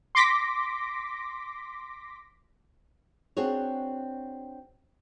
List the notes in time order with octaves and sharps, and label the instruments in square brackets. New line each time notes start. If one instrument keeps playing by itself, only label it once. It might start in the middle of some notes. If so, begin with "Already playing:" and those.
[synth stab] C6 D6 A#6 B6
[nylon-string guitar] C4 D4 F#4 G#4 C#5